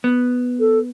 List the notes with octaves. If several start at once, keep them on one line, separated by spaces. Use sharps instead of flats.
B3
A4